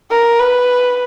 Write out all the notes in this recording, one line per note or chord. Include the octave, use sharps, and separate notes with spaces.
A#4
B4